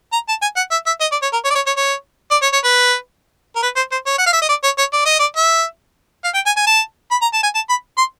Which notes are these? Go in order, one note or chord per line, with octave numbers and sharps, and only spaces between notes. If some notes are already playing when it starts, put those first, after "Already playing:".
A#5
A5
G#5
F#5
E5
E5
D#5
D5
C#5
A#4
C#5
D5
C#5
C#5
C#5
D5
C#5
C#5
B4
A#4
B4
C5
C5
C#5
F#5
F5
E5
D#5
D5
C#5
C#5
D5
D#5
D5
E5
F5
G5
G#5
G#5
A5
B5
A#5
A5
G#5
A5
B5
C6